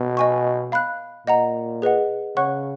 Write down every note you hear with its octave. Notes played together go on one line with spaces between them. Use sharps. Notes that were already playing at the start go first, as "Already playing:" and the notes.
Already playing: B2
D#5 G#5 C#6
F5 B5 F#6
A#2 D#5 F#5 A#5
G#4 B4 D#5 F#5
C#3 C#5 F#5 C#6 F#6